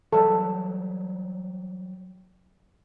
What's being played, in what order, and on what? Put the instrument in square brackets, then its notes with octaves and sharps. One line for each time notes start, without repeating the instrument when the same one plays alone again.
[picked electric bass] E3 F#3 G3 [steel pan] A4